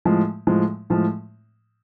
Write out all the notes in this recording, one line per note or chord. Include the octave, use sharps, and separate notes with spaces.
A2 F3 G#3
A2 F3 G#3
A2 F3 G#3